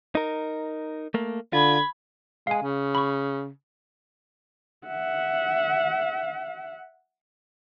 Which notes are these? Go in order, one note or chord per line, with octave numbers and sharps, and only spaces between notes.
D#4 A#4
A3 A#3
D3 F4 B5 G#6
G#3 F5 G#5
C#3
B5 C#6
E5 F#5